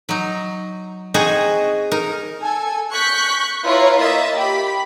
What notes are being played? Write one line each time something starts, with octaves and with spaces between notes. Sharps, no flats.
F#3 D#4
C4 D#4 F#4 G#4 D#5
D#4 A#4
A4 G#5
C#6 F#6 G6 B6
E4 F4 B4 C#5 A#5
A#3 D#5 E5 A6
G4 B5